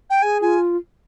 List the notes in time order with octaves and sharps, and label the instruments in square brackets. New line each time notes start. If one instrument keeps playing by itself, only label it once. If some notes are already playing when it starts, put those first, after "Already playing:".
[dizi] G5
[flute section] G#4 [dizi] G#5
[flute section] F4 [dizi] G#5